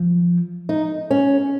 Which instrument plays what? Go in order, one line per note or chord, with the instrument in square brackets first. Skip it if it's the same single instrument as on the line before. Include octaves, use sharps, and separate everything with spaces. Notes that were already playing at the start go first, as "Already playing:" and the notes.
Already playing: [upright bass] F3
[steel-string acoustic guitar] D#4
C#4